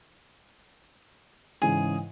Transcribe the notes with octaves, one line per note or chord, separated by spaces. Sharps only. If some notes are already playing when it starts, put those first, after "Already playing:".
G#2 C#3 E3 G#4